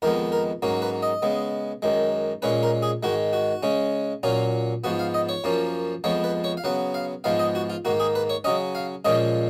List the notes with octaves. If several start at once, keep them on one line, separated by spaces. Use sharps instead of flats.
F2 D#3 G#3 B3 A#4
A#4
G#2 F#3 A#3 C#4
B4
D#5
C#3 G#3 B3
F#2 D#3 G#3
A#2 G#3 C#4 B4
A#4
G#4
G#2 D#3 G#3 F#4
F#4
C#3 G#3 C#4
A#2 F#3 C#4 F4
G#2 F3 B3 F#4
F5
D#5
C#5
F#2 F3 A#3 C#4
F2 F3 G#3 B3 C#5
B4
C#5
F5
C#3 F#3 B3 F#5
F5
G#2 F3 G#3 B3 F5
D#5
F#4
F4
G#2 D#3 A#3 F#4
G#4
B4
C#5
C#3 F#3 C#4 D#5
F5
A#2 F3 G#3 C#4 D#5